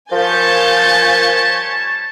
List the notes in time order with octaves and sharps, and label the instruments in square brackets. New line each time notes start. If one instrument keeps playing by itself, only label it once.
[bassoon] F3 [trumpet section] G3 C#5 A5 [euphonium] A#4 [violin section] G#5 G6 A6